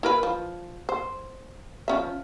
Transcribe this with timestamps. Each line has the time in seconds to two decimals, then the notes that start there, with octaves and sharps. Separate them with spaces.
0.03 E4 A#4 B4
0.23 F3
0.89 C5
1.88 F3 C#4 E5